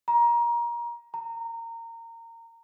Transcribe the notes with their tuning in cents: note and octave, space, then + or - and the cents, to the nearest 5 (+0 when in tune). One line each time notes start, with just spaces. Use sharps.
A#5 +25
A#5 -25